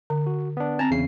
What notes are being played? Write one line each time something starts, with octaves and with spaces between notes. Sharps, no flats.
D3
F#4
B3 D4
C4 A5 A#5
E2 C#3 C7